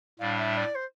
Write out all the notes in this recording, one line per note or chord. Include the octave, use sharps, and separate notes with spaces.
A2 G3 D4 F5
E5
D5
C5